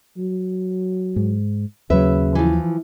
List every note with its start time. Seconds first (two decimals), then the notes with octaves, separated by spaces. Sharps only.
0.18 F#3
1.16 G#2
1.90 D#2 C#3 F#3 B4 E5
2.35 E3 F3